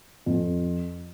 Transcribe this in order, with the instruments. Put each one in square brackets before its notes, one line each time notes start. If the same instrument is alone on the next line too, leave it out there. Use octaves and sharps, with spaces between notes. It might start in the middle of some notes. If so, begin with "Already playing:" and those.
[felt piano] F2